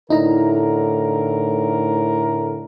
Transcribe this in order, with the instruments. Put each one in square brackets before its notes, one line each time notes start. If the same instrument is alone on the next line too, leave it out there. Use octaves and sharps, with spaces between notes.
[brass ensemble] A2 A#4 [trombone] D3 [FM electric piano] D#4 E4 A#5